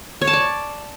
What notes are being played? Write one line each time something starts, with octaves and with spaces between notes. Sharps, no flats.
C#5
A5
D5